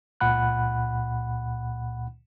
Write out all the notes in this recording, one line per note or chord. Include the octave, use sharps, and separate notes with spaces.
C#2 A#2 F#5 B5 F#6